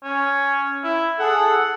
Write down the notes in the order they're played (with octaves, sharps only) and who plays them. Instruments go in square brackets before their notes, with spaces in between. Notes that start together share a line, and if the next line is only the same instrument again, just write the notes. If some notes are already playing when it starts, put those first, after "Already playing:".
[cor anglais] C#4
E4
[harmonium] G#4 A4 [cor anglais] F#5